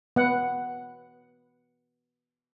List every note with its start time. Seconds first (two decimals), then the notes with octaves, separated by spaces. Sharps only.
0.16 B3 F#5